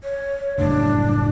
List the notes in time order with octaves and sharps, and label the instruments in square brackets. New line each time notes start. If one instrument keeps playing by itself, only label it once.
[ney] C#5
[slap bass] F#1 A2 G3 [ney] D4